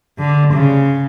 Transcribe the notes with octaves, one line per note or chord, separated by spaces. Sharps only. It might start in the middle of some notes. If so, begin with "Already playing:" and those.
D3
C#3